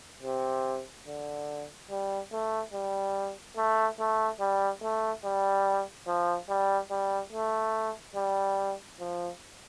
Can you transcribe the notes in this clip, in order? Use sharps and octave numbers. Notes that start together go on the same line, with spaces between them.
C3
D3
G3
A3
G3
A3
A3
G3
A3
G3
F3
G3
G3
A3
G3
F3